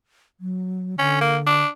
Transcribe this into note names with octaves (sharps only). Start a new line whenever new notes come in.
F#3
D3 C#4
A#3
D4